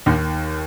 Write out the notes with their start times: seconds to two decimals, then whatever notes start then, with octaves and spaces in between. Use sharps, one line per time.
0.06 D#2 D#3